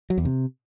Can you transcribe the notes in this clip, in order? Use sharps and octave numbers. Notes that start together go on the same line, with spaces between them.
F#3
E2
C3